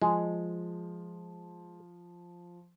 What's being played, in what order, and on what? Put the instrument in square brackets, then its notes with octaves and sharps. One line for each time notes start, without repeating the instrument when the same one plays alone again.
[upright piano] F3 [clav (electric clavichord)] G#3